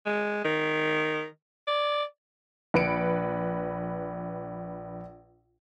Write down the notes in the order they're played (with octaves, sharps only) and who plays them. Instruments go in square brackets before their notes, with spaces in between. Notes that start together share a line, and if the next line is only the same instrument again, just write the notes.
[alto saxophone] G#3
D#3
D5
[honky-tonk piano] A#1 B4 C#7 D7